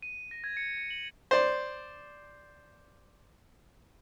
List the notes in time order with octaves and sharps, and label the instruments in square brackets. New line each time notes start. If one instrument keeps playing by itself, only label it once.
[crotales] D#7
A#6
G#6
C#7
C#7
F#7
[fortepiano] C5 D5